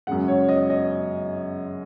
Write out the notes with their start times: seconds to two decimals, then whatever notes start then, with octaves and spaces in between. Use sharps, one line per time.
0.07 F#2 C#3 G#3 F#5
0.28 C#5
0.49 D#5
0.70 D#5